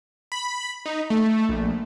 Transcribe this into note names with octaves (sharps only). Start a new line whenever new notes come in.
B5
D#4
A3
A#1